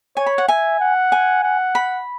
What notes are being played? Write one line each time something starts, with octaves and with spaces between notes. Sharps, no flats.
C#5 G#5
B5
F#5
E5 G#5
F#5
G#5
F#5
B5